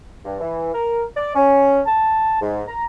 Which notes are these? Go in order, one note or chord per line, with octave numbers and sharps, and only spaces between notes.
G2
E3
A#4
D5
C#4
A5
G#2
A#5